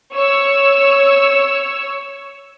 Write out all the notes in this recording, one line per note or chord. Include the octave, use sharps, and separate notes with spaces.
C#5 E6